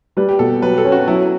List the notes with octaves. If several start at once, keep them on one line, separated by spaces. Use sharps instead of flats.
G3 B4
G4
B2 A4
F#3 B4
A4
C#4
F#4
F#3 E4